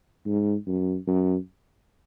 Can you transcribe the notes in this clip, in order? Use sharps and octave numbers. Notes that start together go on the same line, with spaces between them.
G#2
F#2
F#2